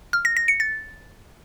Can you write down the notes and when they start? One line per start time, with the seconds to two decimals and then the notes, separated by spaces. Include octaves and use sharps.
0.13 F6
0.25 A#6
0.37 A#6
0.48 C#7
0.60 A6